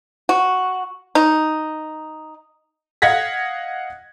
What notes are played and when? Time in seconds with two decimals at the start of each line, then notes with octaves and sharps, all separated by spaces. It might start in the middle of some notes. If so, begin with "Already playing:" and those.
0.29 F#4
1.15 D#4
3.02 D#5 F5 F#5 G#6 A#6 B6